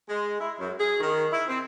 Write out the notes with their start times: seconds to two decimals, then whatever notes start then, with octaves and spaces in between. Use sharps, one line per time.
0.08 G#3
0.38 E4
0.59 F#2
0.78 G#4
1.00 D#3
1.31 E4
1.47 C4